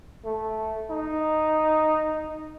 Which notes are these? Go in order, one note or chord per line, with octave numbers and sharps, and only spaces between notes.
A3
D#4